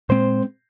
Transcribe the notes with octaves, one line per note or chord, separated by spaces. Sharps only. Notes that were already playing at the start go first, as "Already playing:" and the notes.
A#2 G#3 C4 C5